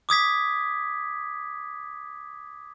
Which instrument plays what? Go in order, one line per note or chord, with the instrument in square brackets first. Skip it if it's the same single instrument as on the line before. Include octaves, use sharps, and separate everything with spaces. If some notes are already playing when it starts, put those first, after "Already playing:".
[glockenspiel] D6 D#6 G#6 B6